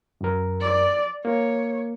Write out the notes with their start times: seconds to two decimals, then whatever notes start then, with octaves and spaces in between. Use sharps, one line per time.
0.21 F#2 A#4
0.61 D5
1.25 A#3 C#5